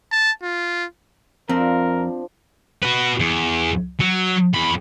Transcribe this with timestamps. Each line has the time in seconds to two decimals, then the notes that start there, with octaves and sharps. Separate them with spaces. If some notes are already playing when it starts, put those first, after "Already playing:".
0.12 A5
0.42 F4
1.49 F2 F3 C4 D4 A#4
2.83 F#4 B4
3.20 E2
4.00 F#3
4.54 E2 B5